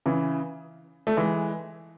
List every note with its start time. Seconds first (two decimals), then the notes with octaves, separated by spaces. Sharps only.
0.06 C#3 E3
1.07 A3
1.17 E3 G#3